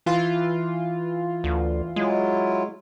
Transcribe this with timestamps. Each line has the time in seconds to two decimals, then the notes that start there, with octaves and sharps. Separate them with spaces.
0.06 E3 F4
1.44 D2
1.96 F#3 G#3 E4 F4